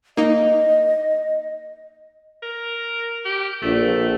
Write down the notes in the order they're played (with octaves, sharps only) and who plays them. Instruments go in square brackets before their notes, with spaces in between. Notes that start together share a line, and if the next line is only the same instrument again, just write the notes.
[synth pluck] A#3 D#4 [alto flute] D#5
[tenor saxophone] A#4
G4
[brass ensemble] A#1 [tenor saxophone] A3